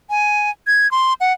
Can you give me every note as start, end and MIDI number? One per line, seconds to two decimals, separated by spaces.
0.10 0.50 80
0.67 0.90 92
0.91 1.14 84
1.21 1.33 78